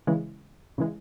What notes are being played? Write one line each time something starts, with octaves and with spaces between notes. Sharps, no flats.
C#3 E3 G#3
C#3 E3 G#3